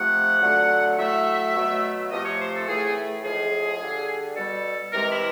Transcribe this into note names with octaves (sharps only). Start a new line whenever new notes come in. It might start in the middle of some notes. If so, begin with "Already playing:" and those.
Already playing: C3 F3 A3 F#5
D3 F#3 A3
A2 F#3 A3 E5
B2 F#3 A3
C3 F3 A3 D#5
C#5
C5
A4
A2 E3 A3 G#4
A2 F3 G#3 G#4
D3 G3
B2 G3 A4
C3 E3 G#3 A#4
E4